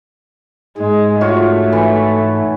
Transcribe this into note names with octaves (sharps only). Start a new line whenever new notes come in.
G#2 G#3
A3 F4 F#4 C#5
E3